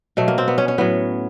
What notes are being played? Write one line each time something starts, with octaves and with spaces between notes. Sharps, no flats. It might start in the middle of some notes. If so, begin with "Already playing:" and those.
B2 F#3 A3
A#3
C4
B3
C#4
C#4
A2 F#3 B3